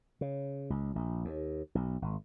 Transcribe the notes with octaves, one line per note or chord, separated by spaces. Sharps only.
C#3
C#2
A#1
D#2
B1
G#1